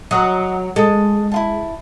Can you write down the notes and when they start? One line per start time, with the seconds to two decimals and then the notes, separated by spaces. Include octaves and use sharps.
0.11 F#3 D#5 F#5 A#5
0.76 G#3 A4 D#5
1.32 E4 F4 A5